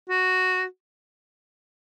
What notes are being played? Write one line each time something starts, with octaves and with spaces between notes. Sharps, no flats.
F#4